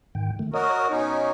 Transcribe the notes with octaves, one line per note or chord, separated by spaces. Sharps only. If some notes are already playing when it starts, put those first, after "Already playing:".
G#2 D#3 G5
D#3 A3
F#4 A#4 C#5 D#5 D#6
B2 C#4 D#4 C#6